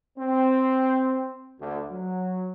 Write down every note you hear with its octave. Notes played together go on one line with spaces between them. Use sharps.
C4
D2
F#3